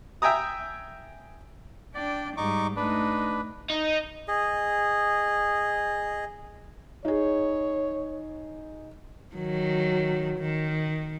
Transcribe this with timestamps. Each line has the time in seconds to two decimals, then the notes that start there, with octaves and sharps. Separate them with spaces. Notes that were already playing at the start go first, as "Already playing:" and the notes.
0.22 E5 G5 G#5 A#5 D#6
1.95 D4 D5 G5
2.37 G#2 G3 D#4 C#6 D6
2.76 A3 D4 D#4 B4
3.70 D#4
4.28 G#4 D#5
7.05 D#4 G#4 C#5
9.35 D#3 F#3
10.39 D#3